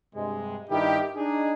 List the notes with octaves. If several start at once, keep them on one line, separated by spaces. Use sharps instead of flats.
G2 C3 G#3
G2 D#3 D#4 E4 G4
D4 D#4 G#4